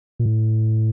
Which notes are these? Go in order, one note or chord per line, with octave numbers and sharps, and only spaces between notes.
A#2
A2